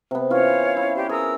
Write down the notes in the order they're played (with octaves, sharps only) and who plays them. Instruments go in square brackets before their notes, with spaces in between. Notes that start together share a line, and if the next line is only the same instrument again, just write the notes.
[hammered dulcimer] C3 B3
[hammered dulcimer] E3 C#4 F4 [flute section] C#5 F5
[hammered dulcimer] E4
[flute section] G4 C5 D5
[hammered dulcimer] G#4 [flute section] A#4 D#6 E6